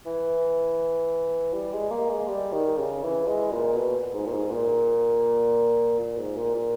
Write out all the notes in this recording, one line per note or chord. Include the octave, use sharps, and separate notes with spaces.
E3
G3
G#3
A#3
G#3
G3
D#3
C#3
E3
G#3
A#2
B2
G#2
A#2
G#2
A#2
A#2
G#2
A#2
A#2